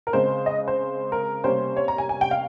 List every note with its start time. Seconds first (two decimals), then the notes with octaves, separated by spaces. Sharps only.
0.07 A#4
0.13 C#3 G#3 C4 C5
0.46 D#5
0.68 C5
1.12 A#4
1.44 C3 G3 A#3 C#4 C5
1.77 C#5
1.88 A#5
1.98 G#5
2.09 G#5
2.21 G5
2.31 F5